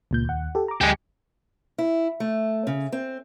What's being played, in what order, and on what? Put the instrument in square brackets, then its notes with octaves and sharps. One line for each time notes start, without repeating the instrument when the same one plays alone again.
[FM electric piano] C#2 A#2 G6
D#2 F#5
G4 A4
A#5 D6
[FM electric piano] D2 G#5 C#7 [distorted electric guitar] G#3 G4
[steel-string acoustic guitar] E4
A3
C#3
C4